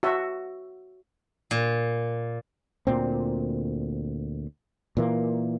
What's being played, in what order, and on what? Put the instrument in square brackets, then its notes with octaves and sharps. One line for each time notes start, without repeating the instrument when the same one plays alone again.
[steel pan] F#4 E5
[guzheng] A#2
[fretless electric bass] D2 A#2 C4
A#2 E3 A#3